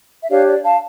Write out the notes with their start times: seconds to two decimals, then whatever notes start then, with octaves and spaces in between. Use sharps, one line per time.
0.22 E5
0.30 D4 G4 C#5 D5 F5
0.48 D5
0.65 F5 A5